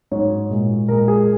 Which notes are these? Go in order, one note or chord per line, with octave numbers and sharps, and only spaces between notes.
G#2 F#3 C#5
A#2 G#3
A#2 G#3 A#4
G#4